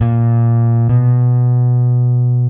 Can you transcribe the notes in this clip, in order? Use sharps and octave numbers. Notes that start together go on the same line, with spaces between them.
A#2
B2